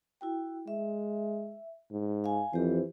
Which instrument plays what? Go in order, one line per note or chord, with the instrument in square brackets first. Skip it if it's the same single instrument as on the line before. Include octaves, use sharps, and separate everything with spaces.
[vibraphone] E4 F#4 G5
[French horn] G#3 [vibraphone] E5
[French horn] G#2
[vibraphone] F5 G#5
[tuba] F2 [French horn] E3 [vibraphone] G4 C5